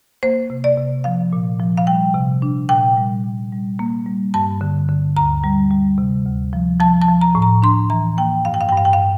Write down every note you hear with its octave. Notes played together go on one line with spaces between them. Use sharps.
A#3 C5
C3
D5
C3
F3 F5
A#2
F3
F5
G3 G5
C3
D4
A#2 G5
G3
A#2
G3
A#3
G3
G2 A5
D3
D3
D2 A#5
G3
G3
C3
D2
F3
F3 A5
A5
F3
A#5
A2
A#5
D4 C6
E3 A#5
A#3 G5
G2 F5
G5
F5
G5
G2 F5
G5
F5